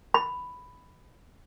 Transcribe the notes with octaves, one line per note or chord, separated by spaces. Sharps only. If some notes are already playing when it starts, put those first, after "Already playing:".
B5